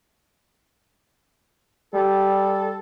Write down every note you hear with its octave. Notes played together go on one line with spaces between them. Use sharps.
G3 A4